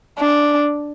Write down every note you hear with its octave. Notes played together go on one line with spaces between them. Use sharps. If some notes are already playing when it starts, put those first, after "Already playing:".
D4